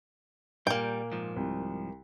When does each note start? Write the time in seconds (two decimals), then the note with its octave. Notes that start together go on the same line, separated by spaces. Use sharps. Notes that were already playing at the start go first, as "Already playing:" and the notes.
0.67 A#2 G3 A#3 G5
1.12 G#2 F3
1.36 C2